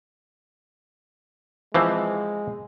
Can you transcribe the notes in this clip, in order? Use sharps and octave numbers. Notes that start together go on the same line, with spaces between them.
E3 F3 G#3 C4